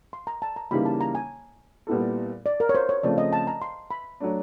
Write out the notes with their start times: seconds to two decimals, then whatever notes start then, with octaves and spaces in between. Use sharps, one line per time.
0.13 C6
0.27 A#5
0.42 A5
0.56 A#5
0.71 C#3 E3 G3 A#3 D#4 B5
0.85 A5
1.01 A#5
1.15 G#5
1.87 A#2 G3 B3 E4 A4
2.46 D5
2.60 A#4
2.69 C#5
2.75 C5
2.89 C#5
3.03 C#3 F3 A3 C4 D5
3.18 D#5
3.33 A5
3.47 A#5
3.62 C6
3.91 B5
4.20 F#3 A3 D4